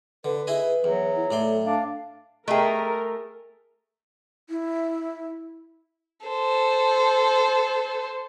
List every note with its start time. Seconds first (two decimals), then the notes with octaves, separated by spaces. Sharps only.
0.24 D3 B4
0.47 E4 G#4 D#5
0.84 E2 F#3
1.16 E4
1.31 A2 A4 D5 C6
1.65 D4 F5
2.48 A3 G#4 A#4 D#5 E5 G5
4.50 E4
6.26 A4 C5